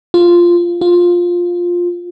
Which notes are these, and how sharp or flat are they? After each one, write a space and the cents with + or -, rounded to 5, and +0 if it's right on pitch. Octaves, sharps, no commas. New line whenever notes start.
F4 -5
F4 +10